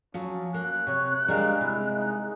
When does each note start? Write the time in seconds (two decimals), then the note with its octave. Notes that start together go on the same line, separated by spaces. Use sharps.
0.14 F3 F#3 C#4
0.54 A#3 F#6
0.87 C3 C#5
1.28 G3 G#3 D4 A#4 F5
1.61 C3 G#3 E4
1.98 D#4